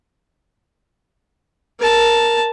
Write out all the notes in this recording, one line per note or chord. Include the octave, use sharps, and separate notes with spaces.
A#4 A5